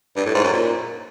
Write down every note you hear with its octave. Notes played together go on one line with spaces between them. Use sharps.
G2
A2
G#2
F#2
A#2